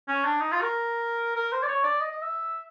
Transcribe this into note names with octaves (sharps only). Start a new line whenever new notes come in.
C#4
D4
D#4
F4
A#4
A#4
C5
D5
C#5
D5
D#5
D#5
E5